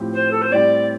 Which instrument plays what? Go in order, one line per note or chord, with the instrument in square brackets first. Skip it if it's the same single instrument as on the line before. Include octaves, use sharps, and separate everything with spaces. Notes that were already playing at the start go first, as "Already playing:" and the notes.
Already playing: [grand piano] A2 F3 C4 G4
[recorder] C5
A4
C5
[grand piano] A2 G3 C4 G4 [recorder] D5